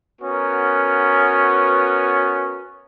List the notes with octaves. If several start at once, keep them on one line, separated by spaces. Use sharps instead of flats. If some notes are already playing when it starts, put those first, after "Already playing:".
B3 C#4 F#4 A#4